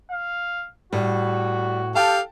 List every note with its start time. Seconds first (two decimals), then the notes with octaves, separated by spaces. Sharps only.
0.11 F5
0.93 A2 G3 F#4
1.95 G4 A4 F5 G5 A5